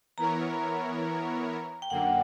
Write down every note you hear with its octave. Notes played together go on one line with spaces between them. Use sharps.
E3 B3 E4 A#4 C#5 A#5
G5
F#2 D3 A#3 F#5